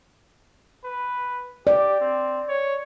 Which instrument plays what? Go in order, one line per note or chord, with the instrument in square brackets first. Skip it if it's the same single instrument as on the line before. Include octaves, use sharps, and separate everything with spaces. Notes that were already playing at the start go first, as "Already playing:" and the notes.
[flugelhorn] B4
[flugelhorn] G4 [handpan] D5
[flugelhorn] C4
C#5